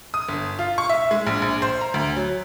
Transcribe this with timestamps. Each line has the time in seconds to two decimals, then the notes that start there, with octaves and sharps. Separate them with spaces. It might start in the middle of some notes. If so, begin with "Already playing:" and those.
0.14 D#6
0.29 G1
0.59 F4
0.78 C#6
0.89 E5
1.11 G#3
1.27 A#1
1.42 A#1
1.62 C5
1.81 A#5
1.94 D2
2.16 F#3